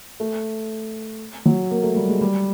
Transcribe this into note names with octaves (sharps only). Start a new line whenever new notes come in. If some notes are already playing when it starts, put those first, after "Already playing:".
A3
F#3
A#3
A3
G3
G#3
G3